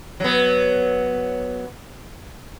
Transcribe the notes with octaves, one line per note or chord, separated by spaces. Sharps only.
F#3 B3